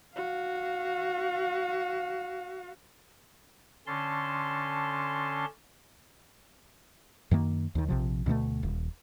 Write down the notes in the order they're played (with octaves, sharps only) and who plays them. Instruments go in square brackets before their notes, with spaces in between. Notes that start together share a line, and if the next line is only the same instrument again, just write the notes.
[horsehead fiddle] F#4 F5
[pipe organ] D3 C#4 A5 C6
[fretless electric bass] F#2 D#3 A#3
D#2 D#3
A#1 C3 F3
D2 B2 G#3 A3
D#1